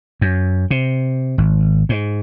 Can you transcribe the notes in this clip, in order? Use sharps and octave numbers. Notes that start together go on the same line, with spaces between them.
F#2
C3
G#1
G#2